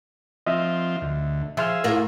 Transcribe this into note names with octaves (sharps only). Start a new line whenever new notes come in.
F3 C4 F4 D#5 E5
D2
F3 G#4 E5 C6 E6 F6
A2 F4 A#4